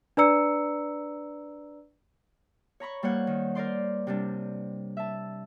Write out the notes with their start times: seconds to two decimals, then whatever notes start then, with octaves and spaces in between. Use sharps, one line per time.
0.17 D4 B4 D5 A#5 E6 C#7
2.80 C#5 A#5 B5 C#6
3.03 G3 A#3 C5 C#5 F#5
3.27 D#3
3.55 A#4 C5 D5 C6
4.07 C3 G3 D4
4.97 E5 A5